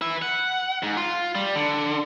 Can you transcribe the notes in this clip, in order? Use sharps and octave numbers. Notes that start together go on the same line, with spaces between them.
B4 E5
F#5
G#2
F4
G3
D3